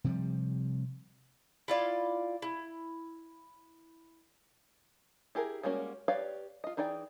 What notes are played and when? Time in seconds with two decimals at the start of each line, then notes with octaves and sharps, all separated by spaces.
0.04 C3 F3 G3
1.68 E4 F4 D5
2.42 E4
5.35 E4 G4 G#4 A#4
5.63 G3 G#3 A#3 C#4 F#4
6.08 G4 B4 C#5 D5 F5
6.64 F4 D#5
6.77 E3 D#4 G#4 D5 G5